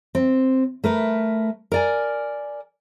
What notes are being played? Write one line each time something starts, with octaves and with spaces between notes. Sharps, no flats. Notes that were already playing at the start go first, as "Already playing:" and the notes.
C4
A3 A#4 B4
A#4 D5 G#5